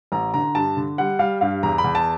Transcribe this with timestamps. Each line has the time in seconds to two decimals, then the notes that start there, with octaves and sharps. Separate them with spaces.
0.12 A1 A#5
0.34 D3 A#5
0.55 G2 A5
0.77 D3
0.98 G3 F#5
1.19 G3 F5
1.41 G2 F5
1.63 E2 A#5
1.78 B5
1.84 E2
1.95 A5